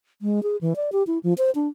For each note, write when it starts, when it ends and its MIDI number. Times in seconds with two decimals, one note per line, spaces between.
0.22 0.43 56
0.43 0.57 68
0.61 0.74 52
0.76 0.90 74
0.92 1.03 67
1.07 1.18 64
1.23 1.34 53
1.38 1.51 72
1.55 1.68 62